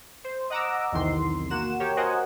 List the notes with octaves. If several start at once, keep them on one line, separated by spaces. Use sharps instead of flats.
C5
D#5 F#5 A#5 D6 E6
B1 E2 C3 D#3 C6
A#3 F#4 F#5 E7
G4 A#4 C#5 G5
F#4 A#4 C5 D#5 F#5 G#5